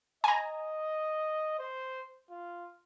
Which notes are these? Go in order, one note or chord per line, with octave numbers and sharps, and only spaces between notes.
D#5 G#5 A#5
C5
F4